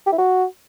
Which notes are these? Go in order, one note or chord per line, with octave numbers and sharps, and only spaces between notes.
G4
E4
F#4